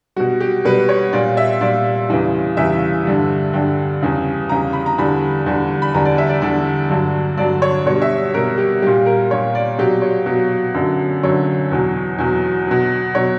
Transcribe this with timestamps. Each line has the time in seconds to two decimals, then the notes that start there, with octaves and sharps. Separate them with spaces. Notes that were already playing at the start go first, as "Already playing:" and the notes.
0.16 B2 G3 F#4
0.41 G4
0.65 B2 G3 B4
0.89 C#5
1.13 A#2 G3 D5
1.37 E5
1.61 A#2 G3 D5
2.09 E2 C#3 E3 G3
2.57 E2 C#3 E3 G3 E5
3.05 G2 D3 G3
3.53 G2 D3 G3 G5
4.01 E2 C#3 G3
4.49 E2 C#3 G3 A#5
4.73 B5
4.86 A#5
4.98 E2 D3 G3 B5
5.46 E2 D3 G3
5.82 B5
5.94 E2 D3 G3 A#5
6.05 D5
6.18 E5
6.29 D5
6.42 E2 D3 G3 D5
6.89 G2 D3 F#3
7.37 G2 D3 F#3 D5
7.62 C#5
7.86 B2 G3 C#5
8.02 E5
8.34 B2 G3 A#4
8.58 G4
8.82 A#2 G3 G4
9.06 A#4
9.30 A#2 G3 C#5
9.55 D5
9.78 B2 F#3 G4
10.02 C#5
10.26 B2 F#3
10.74 F#2 D3 F#3
11.23 F#2 D3 F#3 C#5
11.71 E2 B2 F#3
12.18 E2 B2 F#3
12.67 B2 F#3
13.15 B2 F#3 C#5